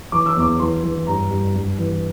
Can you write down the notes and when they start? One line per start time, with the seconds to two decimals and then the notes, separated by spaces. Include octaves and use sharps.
0.12 E3 D6
0.26 E6
0.36 E2 D6
0.60 E3 C6
0.83 E3
1.07 G2 A#5
1.30 G2
1.55 G2
1.78 E3